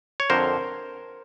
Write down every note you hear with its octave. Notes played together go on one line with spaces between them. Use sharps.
C#5
F2 D3 A#4 C5